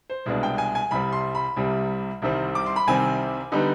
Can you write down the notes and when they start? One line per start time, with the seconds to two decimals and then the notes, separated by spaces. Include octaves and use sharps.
0.10 C5
0.26 C2 B2 G#3 D4
0.43 G5
0.58 G#5
0.75 G#5
0.91 C2 C3 G3 B5
1.12 C6
1.35 B5
1.56 C2 C3 G3
2.22 C2 C3 D#3 G3 C4
2.55 D6
2.66 C6
2.76 B5
2.87 C2 C3 D#3 G3 C4 G#5
3.52 D3 G3 B3 D#4